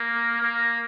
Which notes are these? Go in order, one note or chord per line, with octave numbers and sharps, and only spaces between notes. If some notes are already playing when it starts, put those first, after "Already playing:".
Already playing: A#3
A#3